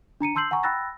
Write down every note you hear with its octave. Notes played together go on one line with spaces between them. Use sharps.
D4 A#5 C#7 D#7
A5 C6 E6 G6 C7 F#7
F#5 G#5 A#5 C#6
G5 B5 E6 F#6 A6 A#6